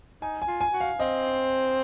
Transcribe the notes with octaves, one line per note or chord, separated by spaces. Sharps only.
D#4 G#5
G#5
F4
G#5
F#4
F5
C4 D#5